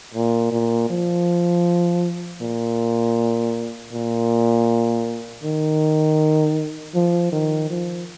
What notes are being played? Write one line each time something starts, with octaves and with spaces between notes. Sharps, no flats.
A#2
A#2
F3
A#2
A#2
D#3
F3
D#3
F3